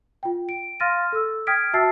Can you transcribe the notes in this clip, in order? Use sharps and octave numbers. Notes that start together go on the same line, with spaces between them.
F4 G5
D7
F5 C6 F6 A6 A#6 D#7
A4 E6
G5 D#6 F6 G#6 B6 D7
F#4 E5 A5 E6 A6 C7